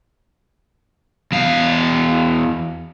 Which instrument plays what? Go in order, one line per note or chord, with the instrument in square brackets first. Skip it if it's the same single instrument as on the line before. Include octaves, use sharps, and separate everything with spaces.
[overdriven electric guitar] E2 F5